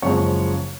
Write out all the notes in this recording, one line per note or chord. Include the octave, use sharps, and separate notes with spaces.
F#1 F#2 F3 G#3 C#5